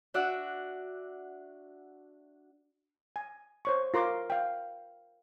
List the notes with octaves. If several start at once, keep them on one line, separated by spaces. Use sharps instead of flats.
D4 F#4 D5 E5 F#5
G#5
C5 C#5 C#6
F4 A#4 C6 D6
F5 G5